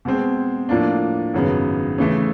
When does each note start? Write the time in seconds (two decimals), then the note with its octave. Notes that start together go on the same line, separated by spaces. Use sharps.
0.05 B2 G#3 C4
0.69 A2 F3 A#3 D4
1.34 G#1 F#2 C#3 F#3 B3
1.98 C#3 E3 A3